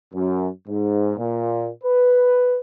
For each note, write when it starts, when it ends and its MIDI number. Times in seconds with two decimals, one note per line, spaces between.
0.14 0.49 42
0.68 1.16 44
1.18 1.70 46
1.83 2.59 71